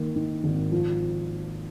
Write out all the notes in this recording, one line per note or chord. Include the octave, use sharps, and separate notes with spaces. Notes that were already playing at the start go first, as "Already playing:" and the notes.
Already playing: D#3 A#3
D#3
G#1
F3